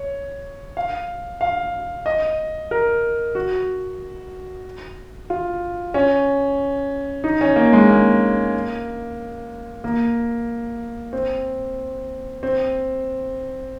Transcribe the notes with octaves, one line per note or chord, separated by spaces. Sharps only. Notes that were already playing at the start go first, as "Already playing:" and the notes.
Already playing: C#5
F5
F5
D#5
A#4
F#4
F4
C#4
D#4
C#4
A#3
G#3
A#3
A#3
C4
C4